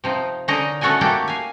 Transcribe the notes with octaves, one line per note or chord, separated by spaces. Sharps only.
C3 F3 D#4
D3 C#4 D#4 A#4 D#5 A#5
A3 C#4 F#4 A4 D#5 G#5
A3 A#3 F#4 G4 A4
F5 G#5